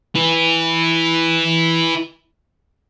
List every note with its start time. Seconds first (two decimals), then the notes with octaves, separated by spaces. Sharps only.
0.16 E4 B4